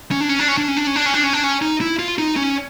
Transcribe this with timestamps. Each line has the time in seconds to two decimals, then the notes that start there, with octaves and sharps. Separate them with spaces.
0.11 C#4
0.21 D4
0.29 C#4
0.39 D4
0.48 C#4
0.57 D4
0.68 C#4
0.77 D4
0.87 C#4
0.96 D4
1.06 C#4
1.14 D4
1.24 C#4
1.33 D4
1.43 C#4
1.62 D#4
1.81 E4
1.99 F4
2.18 D#4
2.36 C#4